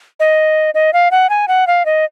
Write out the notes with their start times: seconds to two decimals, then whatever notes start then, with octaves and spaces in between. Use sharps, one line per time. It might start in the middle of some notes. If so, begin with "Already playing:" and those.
0.20 D#5
0.74 D#5
0.93 F5
1.11 F#5
1.30 G#5
1.48 F#5
1.67 F5
1.86 D#5